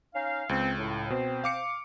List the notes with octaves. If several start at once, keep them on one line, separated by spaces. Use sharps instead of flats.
C#4 D#4 F5
C#2 C4
A2
B2 C4 C5
F5 D6 C#7